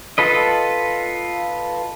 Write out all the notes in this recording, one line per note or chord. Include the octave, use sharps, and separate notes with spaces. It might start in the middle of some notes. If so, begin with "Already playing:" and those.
F4 A4 B4 D#5